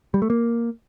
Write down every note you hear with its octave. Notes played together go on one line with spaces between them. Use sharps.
G3
A3
A#3